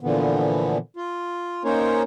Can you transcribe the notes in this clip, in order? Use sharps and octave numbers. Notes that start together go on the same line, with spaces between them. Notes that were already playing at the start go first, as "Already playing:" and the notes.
A#2 D3 E3 F3 B3
F4
A#3 C#4 D#4 A#4 C5 C#5